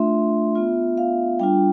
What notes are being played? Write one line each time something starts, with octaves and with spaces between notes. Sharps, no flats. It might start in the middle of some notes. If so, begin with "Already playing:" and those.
Already playing: A3 D4 F4 E5 C6
B3 F4
F5
G3 D4 F4 G5